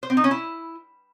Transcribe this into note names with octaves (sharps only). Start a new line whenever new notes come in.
C5
C4
D#4
C#4
E4